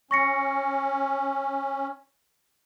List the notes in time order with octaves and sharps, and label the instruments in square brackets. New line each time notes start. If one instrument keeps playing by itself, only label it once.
[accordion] C#4 [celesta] C#6 A#6 C#7